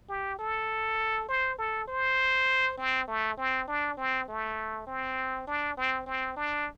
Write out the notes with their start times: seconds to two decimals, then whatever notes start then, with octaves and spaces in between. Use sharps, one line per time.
0.09 G4
0.39 A4
1.29 C5
1.58 A4
1.88 C5
2.78 C4
3.08 A3
3.37 C4
3.68 D4
3.97 C4
4.28 A3
4.87 C4
5.47 D4
5.77 C4
6.06 C4
6.36 D4